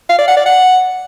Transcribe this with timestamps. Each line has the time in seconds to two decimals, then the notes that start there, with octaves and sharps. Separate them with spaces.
0.09 F5
0.18 D5
0.27 F#5
0.37 D5
0.46 F#5